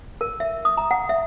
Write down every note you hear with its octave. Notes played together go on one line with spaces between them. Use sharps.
A#4
E5
D#6
A#5
F#5
E5